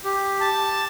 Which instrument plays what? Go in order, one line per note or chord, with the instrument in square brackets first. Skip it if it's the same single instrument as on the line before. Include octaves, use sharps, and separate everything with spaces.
[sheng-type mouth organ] G4
A5